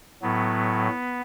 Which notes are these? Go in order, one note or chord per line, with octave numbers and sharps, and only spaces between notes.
A2 F#3 B3